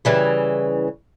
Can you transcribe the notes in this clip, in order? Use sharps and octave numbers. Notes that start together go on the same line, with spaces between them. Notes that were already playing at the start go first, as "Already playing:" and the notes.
C#3 E3 G3